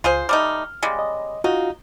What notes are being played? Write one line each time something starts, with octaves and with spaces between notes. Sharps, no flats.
C#2 F4 G#4 C5
G3 A3 D#4 F6
C#3 G3 G#3
D#5
D#4 F4 F#4 F5